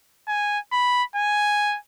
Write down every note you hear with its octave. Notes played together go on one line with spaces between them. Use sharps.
G#5
B5
G#5